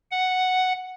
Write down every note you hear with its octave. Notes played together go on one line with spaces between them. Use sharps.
F#5